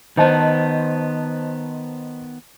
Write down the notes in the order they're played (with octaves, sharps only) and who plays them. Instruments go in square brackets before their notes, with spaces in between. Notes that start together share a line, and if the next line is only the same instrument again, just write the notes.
[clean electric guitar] D#3 B3 [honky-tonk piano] C5 D#5 A5